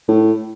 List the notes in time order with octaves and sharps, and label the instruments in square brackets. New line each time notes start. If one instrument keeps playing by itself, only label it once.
[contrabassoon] A2